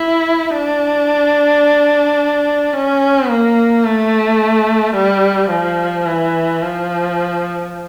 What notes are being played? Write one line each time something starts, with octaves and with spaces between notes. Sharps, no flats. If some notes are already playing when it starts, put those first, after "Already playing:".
Already playing: E4
D4
C#4
A#3
A3
G3
F3
E3
F3